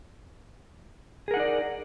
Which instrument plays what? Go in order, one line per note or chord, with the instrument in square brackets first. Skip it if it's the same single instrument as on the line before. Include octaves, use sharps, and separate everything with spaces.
[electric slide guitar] G#4
A#4
F#5
D#4
D5